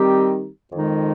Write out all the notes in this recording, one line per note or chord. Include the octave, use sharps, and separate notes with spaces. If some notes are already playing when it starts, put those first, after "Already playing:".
Already playing: D#3 G3 C4 D#4 G4
F2 D#3 G#3 D#4